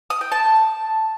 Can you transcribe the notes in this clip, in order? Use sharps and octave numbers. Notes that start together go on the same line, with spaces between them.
D#6
G5
A5